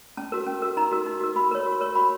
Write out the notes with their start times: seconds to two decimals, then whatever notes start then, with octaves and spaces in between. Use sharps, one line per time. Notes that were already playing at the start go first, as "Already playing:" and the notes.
0.17 C#4 A5
0.32 F#4 A#4
0.47 C#4
0.62 F#4 A#4
0.77 D#4 A#5
0.92 F#4 A#4
1.06 D#4
1.21 F#4 A#4
1.36 F#4 B5
1.51 A#4 C#5
1.66 F#4
1.81 A#4 C#5
1.95 F#4 B5